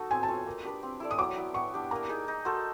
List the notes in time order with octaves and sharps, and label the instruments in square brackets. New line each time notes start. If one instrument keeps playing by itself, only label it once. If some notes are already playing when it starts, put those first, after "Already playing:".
Already playing: [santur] D#4 F#4 A4
[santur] C4 [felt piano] G#5
[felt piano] A5
[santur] F4 A4 C#5
A#3
D4 G4 B4
C4
E4 A4 D5
[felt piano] D#6
[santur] F#3 [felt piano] D6
[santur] B3 E4
[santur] B3 [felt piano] C#6
[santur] D4 G4
[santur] A#3 [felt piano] A#5
[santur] D#4 G#4
D#4
F#4 A4 C5